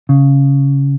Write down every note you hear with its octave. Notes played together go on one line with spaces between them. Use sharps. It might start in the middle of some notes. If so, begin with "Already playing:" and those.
C#3